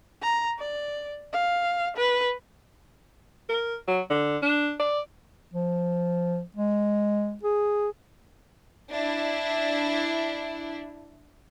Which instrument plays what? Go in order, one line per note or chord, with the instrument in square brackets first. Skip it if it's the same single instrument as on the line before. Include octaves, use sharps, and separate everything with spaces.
[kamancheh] A#5
D5
F5
B4
[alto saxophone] A#4
F#3
D3
D4
D5
[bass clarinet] F3
G#3
G#4
[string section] D4 E4